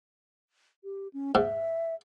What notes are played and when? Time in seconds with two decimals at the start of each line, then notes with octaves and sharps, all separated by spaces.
0.84 G4
1.13 C#4
1.35 G#2 E5